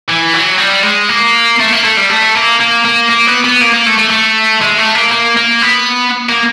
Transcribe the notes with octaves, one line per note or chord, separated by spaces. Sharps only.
E3
F#3
G3
G#3
A#3
A3
A#3
A3
G3
A3
A#3
A#3
A#3
A#3
B3
B3
A#3
A#3
A3
A3
A3
G#3
A3
A#3
A#3
A#3
B3
A#3